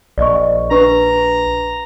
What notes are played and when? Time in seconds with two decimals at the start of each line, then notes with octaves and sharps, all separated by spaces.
0.18 A#1 D5 D#5 C#6
0.71 D4 B4 A#5 C#6